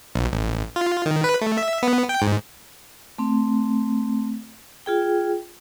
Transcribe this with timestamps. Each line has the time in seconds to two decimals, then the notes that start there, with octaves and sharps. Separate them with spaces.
0.15 B1
0.33 A1
0.76 F4
1.06 D#3
1.24 B4
1.41 A3
1.58 E5
1.83 B3
2.09 G5
2.22 G#2
3.18 A3 C4
4.86 F4 G#4 G5